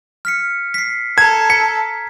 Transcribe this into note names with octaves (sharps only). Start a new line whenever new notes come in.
F6 B6 C#7
B6 C7
A4 A5 A#5 G#6
B6 C#7